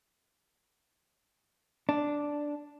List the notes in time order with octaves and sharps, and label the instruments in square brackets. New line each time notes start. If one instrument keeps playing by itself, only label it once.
[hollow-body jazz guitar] D4